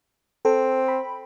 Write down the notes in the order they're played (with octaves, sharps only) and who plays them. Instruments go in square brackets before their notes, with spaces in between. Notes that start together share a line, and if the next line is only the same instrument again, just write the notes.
[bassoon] C4 [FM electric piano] A4
[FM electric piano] B5